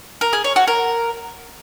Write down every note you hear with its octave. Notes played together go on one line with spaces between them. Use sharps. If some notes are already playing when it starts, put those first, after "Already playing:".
A#4
G#4
C#5
F#4
A#4